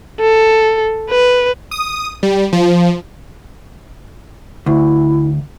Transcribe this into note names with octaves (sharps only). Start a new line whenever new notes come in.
A4
B4
D#6
G3
F3
D2 E4